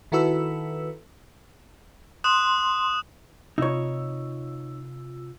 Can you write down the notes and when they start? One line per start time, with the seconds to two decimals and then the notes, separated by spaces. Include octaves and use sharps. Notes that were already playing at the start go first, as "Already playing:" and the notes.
0.12 D#3 E4 F#4 A4 B4 E6
2.24 C6 D#6 F#6 E7
3.58 C3 D#4 F4 C#5 E6